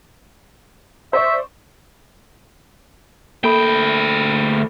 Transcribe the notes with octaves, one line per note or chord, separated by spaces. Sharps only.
C5 D5 E5 C#6
D2 A#3 A4 G5 B5